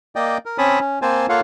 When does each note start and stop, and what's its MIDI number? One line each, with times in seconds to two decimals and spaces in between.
0.16 0.38 58
0.16 0.38 74
0.16 0.38 75
0.16 0.38 79
0.46 0.57 70
0.58 0.79 60
0.58 0.79 61
0.58 0.79 73
0.58 0.79 81
0.58 0.79 83
0.58 0.79 87
0.80 0.99 61
1.02 1.26 58
1.02 1.26 60
1.02 1.26 72
1.02 1.26 80
1.02 1.26 81
1.29 1.41 58
1.29 1.41 65
1.29 1.41 69
1.29 1.41 73
1.29 1.41 77
1.29 1.41 78